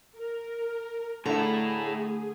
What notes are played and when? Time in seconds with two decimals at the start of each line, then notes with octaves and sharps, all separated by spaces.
0.16 A#4
1.26 A2 D3 A3 E4 G#4 A#5